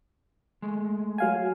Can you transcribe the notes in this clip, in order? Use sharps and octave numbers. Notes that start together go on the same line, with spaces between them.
G#3 A3
F#3 F5 G#5